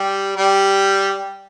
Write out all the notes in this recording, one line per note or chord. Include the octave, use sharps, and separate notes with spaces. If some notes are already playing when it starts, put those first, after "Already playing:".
Already playing: G3 G4
G3 G4